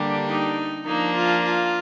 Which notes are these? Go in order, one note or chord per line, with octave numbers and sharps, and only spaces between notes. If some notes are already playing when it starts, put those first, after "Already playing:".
Already playing: D3 G3 A#3 D4 G4
D#4
F3 A#3 D4 D#4
F4
F4